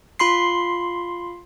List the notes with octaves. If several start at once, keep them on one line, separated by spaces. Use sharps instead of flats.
F4 B5 C6 C7